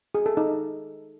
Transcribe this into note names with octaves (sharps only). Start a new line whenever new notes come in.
G#4
A4
D#4